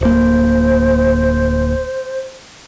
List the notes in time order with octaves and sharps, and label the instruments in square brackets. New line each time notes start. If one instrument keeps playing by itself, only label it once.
[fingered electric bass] D1 A#3 [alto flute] C5